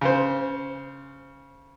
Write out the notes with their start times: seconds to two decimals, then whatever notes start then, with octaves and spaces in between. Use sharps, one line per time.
0.01 C#3 C5